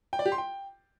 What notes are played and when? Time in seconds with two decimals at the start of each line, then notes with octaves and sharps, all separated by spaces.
0.13 G5
0.19 D5
0.26 G4
0.32 C6
0.38 G5